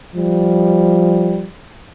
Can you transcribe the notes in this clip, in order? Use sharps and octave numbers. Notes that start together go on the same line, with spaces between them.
F3 G3